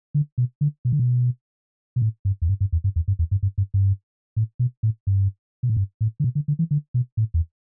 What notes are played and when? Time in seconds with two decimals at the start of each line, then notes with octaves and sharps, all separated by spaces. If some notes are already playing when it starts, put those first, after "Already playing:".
0.14 D3
0.38 B2
0.61 D3
0.85 B2
0.92 D3
0.99 B2
1.96 B2
2.02 A2
2.25 G2
2.42 E2
2.49 G2
2.61 G2
2.72 E2
2.84 G2
2.96 E2
3.08 G2
3.19 E2
3.31 G2
3.43 G2
3.58 G2
3.74 G2
4.36 A2
4.59 B2
4.83 A2
5.07 G2
5.63 B2
5.70 A2
5.76 G2
6.01 A2
6.20 D3
6.24 B2
6.35 D3
6.48 D3
6.59 E3
6.71 D3
6.94 B2
7.17 A2
7.34 E2